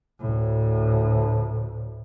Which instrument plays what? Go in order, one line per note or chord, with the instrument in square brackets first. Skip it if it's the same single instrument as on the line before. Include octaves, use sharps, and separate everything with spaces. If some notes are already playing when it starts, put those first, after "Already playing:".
[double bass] D2 A2